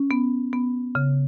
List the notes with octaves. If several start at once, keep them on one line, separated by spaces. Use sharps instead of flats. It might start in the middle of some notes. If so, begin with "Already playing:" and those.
Already playing: C#4
B3
B3
C#3